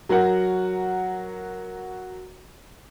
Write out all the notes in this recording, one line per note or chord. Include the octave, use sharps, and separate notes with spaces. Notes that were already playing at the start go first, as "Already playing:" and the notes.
F#3 F#4 A#4 F#5